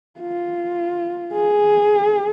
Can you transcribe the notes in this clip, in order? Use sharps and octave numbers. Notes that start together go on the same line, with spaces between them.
F4
G#4